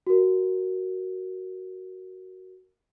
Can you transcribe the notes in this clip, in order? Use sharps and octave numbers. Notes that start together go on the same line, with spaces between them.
F#4 A#4